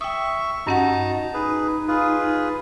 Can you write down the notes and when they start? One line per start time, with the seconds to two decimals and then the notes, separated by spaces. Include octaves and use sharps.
0.01 E5 G5 C#6 D#6
0.67 G2 C#4 D#4 F#4 F#5 A5 A#5
1.34 D#4 G#4 B4
1.88 F4 G#4 B4